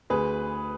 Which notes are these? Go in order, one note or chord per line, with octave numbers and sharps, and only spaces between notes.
D2 G#4 B4